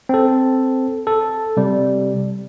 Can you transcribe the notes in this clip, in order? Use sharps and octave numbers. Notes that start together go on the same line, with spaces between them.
C4 A4
A4
C3 G3